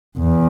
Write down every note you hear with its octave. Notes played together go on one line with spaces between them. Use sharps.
E2